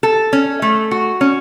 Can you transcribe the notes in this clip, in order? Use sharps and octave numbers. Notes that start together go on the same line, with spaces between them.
A4
C#4
A3
F#4
C#4